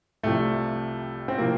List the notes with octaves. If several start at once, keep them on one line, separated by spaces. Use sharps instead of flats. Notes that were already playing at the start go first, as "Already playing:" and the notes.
C2 C3 F3 A3
C4
C3 F3 A#3